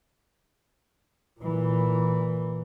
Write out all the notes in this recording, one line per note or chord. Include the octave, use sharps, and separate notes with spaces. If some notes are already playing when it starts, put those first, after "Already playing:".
A#2 E3